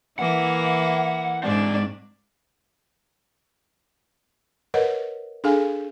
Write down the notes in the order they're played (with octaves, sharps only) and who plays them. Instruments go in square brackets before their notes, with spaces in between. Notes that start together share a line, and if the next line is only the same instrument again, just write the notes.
[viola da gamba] E3 A#3 E4 [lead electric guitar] F#5
[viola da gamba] G#2 D4 [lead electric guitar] C4 D5
[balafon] A#4 B4 C#5 D#5 F#5
D4 G#4 A4 F5 G#5